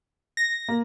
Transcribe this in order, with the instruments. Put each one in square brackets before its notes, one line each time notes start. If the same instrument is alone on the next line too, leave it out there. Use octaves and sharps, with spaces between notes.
[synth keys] A#6
[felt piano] A#3